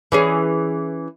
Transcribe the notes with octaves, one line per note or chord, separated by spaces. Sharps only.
E3 C#4 G#4